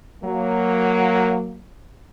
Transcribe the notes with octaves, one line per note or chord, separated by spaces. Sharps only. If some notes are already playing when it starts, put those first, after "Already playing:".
F#3 A#3